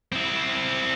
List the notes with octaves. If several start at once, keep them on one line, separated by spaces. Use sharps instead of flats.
C4 E4